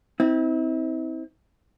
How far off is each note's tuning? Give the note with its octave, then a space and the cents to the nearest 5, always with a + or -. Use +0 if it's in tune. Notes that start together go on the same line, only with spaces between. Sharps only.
C4 -10 E4 -45